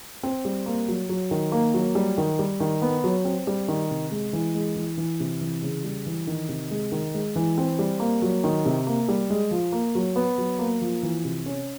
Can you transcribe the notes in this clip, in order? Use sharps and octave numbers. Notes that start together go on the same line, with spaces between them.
C4
G3
A#3
F#3
F#3
D#3
A#3
F#3
G3
D#3
G3
D#3
B3
F#3
C4
G3
D#3
C3
G#3
E3
G#3
E3
E3
C3
E3
C#3
G3
E3
D#3
C3
G#3
D#3
G#3
E3
C4
G3
A#3
F#3
D#3
C3
A#3
G3
G#3
F3
A#3
F#3
B3
F#3
A#3
F3
E3
C3
C#4